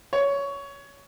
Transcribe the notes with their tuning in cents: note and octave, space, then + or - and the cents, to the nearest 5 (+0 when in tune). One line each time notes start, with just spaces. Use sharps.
C#5 +15